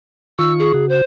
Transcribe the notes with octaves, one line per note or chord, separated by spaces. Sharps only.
D#3 F4 C#6 E6
G#4
C#3 F#4
C5